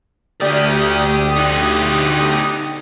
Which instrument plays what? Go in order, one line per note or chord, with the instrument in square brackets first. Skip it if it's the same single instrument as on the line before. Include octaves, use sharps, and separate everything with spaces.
[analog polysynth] D2 G4 D#6 [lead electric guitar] A3 D5
[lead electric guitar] D#4 F#4